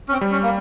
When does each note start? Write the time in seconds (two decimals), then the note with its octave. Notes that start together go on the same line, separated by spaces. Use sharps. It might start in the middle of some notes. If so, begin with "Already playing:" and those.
0.08 C#4
0.12 C4
0.21 G3
0.32 C#4
0.43 A#3